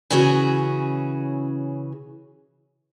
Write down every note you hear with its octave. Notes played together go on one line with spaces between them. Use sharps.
C#3 E3 C#4 F#4 G#4